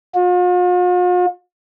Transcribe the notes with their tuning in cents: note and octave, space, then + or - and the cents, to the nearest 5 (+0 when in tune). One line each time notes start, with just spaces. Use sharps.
F4 +45